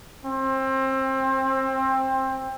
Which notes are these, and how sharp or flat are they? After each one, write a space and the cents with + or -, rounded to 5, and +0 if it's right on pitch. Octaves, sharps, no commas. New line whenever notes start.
C4 +25